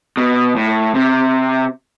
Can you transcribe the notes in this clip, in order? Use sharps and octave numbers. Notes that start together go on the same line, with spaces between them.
B2
A2
C3